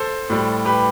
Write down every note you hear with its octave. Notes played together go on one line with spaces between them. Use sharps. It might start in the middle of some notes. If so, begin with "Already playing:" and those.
Already playing: A4 C5
A2 G3
G4 B4